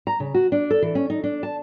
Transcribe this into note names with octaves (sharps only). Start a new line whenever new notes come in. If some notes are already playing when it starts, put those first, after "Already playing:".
A#5
C#3
F#4
D4
A4
E3
C#4
D#4
D4
A5